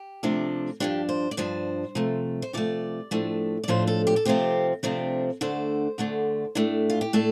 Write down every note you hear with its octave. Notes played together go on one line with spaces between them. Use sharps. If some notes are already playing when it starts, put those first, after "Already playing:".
Already playing: G4
C3 F3 A3 D4
G2 F3 D4 G4
C5
D5
G2 F3 D4 C5
C3 F3 A3
C5
C3 F3 A3 D5
A2 F3 A3 D4
D5
A2 F3 A3 D4 C5
A4
G4
A4
C3 F3 A3 C4 G4
C3 F3 A3 C4 D4
D2 D3 A3 D4 C5
D2 D3 A3 D4
A2 A3 D4
F4
G4
A2 A3 D4 A4